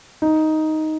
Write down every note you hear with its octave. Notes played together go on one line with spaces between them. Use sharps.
D#4